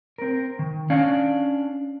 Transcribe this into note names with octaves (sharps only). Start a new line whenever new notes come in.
C4 A#4
D#3
C#4 D4 F5 G#5